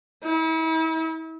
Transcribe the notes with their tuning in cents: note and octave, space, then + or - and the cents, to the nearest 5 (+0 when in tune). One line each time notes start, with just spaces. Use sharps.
E4 -40